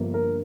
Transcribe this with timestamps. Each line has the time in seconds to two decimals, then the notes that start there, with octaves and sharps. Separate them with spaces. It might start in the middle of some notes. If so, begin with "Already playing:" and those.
Already playing: G1 G2 F3 A#3
0.14 A#4